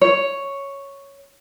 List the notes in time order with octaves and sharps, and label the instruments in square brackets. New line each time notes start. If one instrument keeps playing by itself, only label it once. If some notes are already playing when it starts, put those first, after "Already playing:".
[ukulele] C#5